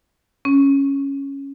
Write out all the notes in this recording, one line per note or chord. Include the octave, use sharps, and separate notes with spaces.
C#4